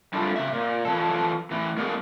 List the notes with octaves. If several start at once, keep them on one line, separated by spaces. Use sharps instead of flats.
G3 D4 E4 F4 A4
C#3 G#3 E5
A#2
E3 F3 A4
A2 E3
G#3 A#3 D4 F#4 G#4 A4